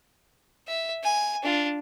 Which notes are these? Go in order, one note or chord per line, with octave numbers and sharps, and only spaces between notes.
E5
G#5
D4 F4